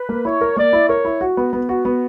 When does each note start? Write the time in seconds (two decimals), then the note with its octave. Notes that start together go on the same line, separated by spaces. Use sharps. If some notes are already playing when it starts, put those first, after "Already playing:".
Already playing: B4
0.09 A#3
0.24 E4 C#5
0.41 A#4
0.57 A#3 D5
0.73 E4
0.89 A#4 C#5
1.05 E4
1.21 F#4
1.37 B3
1.53 B3
1.69 F#4
1.85 B3